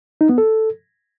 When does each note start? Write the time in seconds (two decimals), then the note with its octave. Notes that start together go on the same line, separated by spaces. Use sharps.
0.21 D#4
0.29 B3
0.38 A4